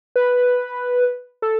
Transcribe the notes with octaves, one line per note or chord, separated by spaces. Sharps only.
B4
A4